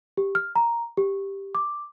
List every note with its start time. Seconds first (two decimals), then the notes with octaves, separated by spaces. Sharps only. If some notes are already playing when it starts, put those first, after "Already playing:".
0.17 G4
0.35 F6
0.56 A#5
0.97 G4
1.55 D6